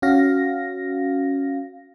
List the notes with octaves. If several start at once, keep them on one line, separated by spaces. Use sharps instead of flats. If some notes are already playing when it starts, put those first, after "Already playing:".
C#4 F#4 F5 A#6